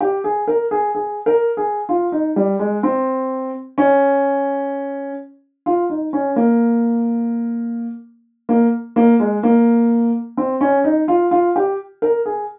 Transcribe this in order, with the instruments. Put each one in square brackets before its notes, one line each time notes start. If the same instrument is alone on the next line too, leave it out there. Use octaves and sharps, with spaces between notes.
[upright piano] G4
G#4
A#4
G#4
G#4
A#4
G#4
F4
D#4
G3
G#3
C4
C#4
F4
D#4
C#4
A#3
A#3
A#3
G#3
A#3
C4
C#4
D#4
F4
F4
G4
A#4
G#4